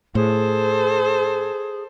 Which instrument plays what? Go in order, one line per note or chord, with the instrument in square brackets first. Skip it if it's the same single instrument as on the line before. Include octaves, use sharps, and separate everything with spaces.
[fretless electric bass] A2 [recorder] G#4 [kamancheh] A4 C5